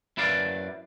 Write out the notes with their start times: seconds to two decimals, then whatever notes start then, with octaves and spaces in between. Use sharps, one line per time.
0.17 F#2 E4 B4 D5 F5